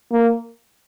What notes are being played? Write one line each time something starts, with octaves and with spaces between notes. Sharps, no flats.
A#3